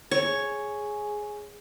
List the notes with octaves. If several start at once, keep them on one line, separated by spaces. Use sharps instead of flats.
G#4 C#5